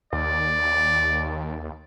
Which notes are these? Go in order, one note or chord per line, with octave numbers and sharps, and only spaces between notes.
D#2 D5